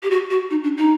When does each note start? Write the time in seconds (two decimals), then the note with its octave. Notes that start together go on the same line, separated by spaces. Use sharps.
0.03 G4
0.11 F#4
0.31 F#4
0.51 D#4
0.63 D4
0.77 D#4